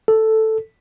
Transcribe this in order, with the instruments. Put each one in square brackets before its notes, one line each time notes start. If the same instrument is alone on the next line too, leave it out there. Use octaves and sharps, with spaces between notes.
[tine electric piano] A4